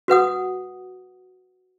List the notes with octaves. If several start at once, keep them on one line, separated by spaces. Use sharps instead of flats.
F#4 B4 F#5 D#6